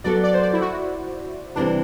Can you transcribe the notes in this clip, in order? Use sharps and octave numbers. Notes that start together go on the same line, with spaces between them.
F#3 B3 F#4 A4 D5
D5
C5
D5
E4
F#4
C3 E3 G3 C4 D4